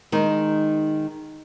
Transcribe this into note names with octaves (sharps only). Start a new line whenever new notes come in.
D#3 G#3 D#4